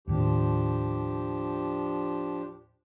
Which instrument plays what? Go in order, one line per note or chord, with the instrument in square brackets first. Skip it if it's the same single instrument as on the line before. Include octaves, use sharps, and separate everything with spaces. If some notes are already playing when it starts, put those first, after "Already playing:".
[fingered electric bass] D#2 A2 D#3 [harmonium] F3 D4 G4